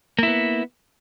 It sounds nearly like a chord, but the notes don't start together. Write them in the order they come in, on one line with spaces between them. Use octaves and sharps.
A#3 E4 B3